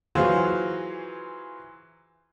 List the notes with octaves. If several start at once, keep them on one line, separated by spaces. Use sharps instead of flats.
E3 F#3 F4 G#4 C5